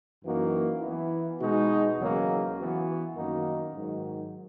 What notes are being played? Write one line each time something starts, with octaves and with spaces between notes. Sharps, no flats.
F#2 E3 A#3 D#4 F#4
E3 B3 E4
B2 G#3 D#4 F#4
E2 C#3 F#3 A#3 C#4
E3 B3 F#4
F#2 D#3 A#3 D#4 F#4
G#2 D#3 F#3